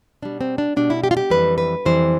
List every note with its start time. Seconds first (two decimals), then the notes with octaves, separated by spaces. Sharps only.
0.22 B2 G3 D4
0.41 C4
0.58 D4
0.77 B2 G3 D4
0.90 E4
1.04 G4
1.11 F4
1.17 G4
1.30 F2 E3 G3 B4
1.58 B4
1.85 F2 E3 G3 C5